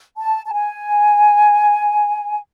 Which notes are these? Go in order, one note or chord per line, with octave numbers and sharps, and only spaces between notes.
A5
A5
G#5